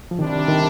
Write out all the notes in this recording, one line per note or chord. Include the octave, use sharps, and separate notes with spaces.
F3
C3 D#3 G3 D4
D#3